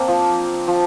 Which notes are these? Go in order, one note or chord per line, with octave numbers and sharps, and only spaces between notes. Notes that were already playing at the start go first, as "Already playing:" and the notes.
Already playing: A#3 C4 D4
F3
F3